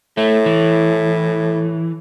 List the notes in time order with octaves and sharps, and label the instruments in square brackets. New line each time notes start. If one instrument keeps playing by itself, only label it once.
[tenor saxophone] A2 [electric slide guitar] A3
[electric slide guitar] E3